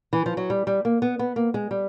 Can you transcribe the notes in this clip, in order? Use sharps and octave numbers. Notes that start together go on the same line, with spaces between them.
E3
F3
F#3
G3
G3
A#3
B3
B3
A#3
G#3
G3